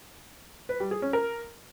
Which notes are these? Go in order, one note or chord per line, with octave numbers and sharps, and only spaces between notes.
B4
G3
G#4
C#4
A#4